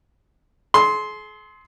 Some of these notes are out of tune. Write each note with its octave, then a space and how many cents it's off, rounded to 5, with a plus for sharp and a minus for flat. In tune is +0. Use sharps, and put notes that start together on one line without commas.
G#4 +45 C6 +0